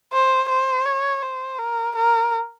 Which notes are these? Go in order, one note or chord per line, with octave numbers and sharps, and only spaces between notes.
C5
C5
C#5
C5
A#4
A#4